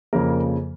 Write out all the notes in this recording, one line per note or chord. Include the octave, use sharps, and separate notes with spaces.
F2 C#3 F3 A#3 A#4